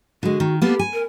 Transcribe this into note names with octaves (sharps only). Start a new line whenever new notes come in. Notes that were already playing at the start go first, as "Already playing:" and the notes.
D3 G#3 F#4
D#3
A#3 B3 G4 A4
G#5
A#4